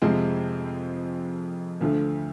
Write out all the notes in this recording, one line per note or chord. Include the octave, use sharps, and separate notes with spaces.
F2 C3 F3 G#3 C4
D2 D3 F3 A3